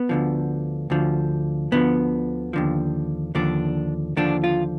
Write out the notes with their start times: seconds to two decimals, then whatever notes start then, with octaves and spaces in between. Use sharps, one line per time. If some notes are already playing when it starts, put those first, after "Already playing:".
Already playing: B3
0.09 D2 D3 F3
0.90 D2 D3 F3
1.72 D2 D3 F3 B3
2.53 D#2 D3 F3
3.35 D#2 D3 F3 D4
4.17 D#2 D3 F3 D4
4.44 F4